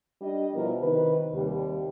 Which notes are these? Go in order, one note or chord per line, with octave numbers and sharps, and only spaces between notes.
G3 D4 G4 D#5
B2 F3 G3 B3 E4 A#4
C3 D#3 B4
D#2 C3 G3